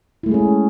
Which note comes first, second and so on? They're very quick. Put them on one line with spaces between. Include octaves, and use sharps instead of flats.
E4 A3 G#3 G#4 C#4